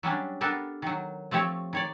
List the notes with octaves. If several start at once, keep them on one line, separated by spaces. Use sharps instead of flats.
F#3 G3 C#4 D4
B3 D4 G4 A4 A#4
D#3 F#3
F3 A3 C4 G4 C#5
D#3 C#5 D5